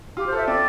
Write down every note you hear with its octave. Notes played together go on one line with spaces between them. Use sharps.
F4 G4
C5
A4
E5
C4 D5